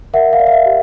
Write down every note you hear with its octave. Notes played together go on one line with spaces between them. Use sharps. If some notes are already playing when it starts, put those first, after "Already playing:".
A#4 E5 F#5
F5
D5
F5
E5
G4